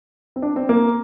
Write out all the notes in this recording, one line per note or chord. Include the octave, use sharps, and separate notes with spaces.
C4
D4
C4
A#3